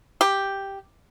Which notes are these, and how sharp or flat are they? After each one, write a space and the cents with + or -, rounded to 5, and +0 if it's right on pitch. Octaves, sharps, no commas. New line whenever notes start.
G4 +0